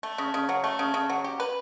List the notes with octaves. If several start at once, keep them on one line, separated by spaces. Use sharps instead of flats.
A3
C#3
C#3
F#3
A3
C#3
C#3
F#3
G4
B4